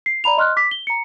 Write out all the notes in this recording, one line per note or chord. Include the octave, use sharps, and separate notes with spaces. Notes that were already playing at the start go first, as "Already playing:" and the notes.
C7
D5 A#5 B5 F7
D#5 C6 F6 F#6
D6 B6
G7
A#5 C#7